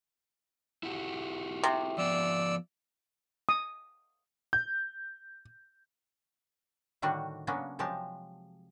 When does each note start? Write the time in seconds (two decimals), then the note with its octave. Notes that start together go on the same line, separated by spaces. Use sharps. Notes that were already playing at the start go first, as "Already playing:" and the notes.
0.83 E4 F#4 G4
1.63 C3
1.98 F3 B3 D5 E6
3.49 D#6
4.53 G6
7.02 A2 D3 D#3 G3 D4 F#4
7.47 C#3 F#3 A#3 B3 C#4 D4
7.79 C3 F3 F#3 G#3 G4 A5